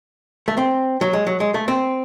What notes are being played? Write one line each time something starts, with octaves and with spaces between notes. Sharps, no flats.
A3
C4
F#3
G#3
F#3
G#3
A3
C4